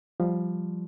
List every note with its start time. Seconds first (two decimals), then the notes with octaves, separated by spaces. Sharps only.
0.20 F3 G3